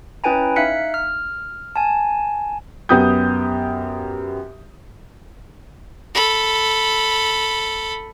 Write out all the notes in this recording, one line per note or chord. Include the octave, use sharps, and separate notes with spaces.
C#4 E4 B4 G5 G#5 A#5
D#4 E5 F5 F#6 B6 C#7
F6
G#5 A5
F#2 B3 G4 D#6 G6
A4 B5